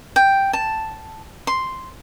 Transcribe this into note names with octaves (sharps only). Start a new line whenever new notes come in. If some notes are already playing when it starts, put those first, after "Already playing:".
G5
A5
C6